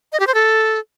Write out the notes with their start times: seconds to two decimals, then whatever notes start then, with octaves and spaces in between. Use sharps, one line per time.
0.13 D#5
0.20 G4
0.27 C5
0.34 A4